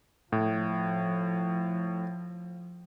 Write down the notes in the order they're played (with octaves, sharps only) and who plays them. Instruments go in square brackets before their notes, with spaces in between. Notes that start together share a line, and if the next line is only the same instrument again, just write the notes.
[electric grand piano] A2 [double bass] F3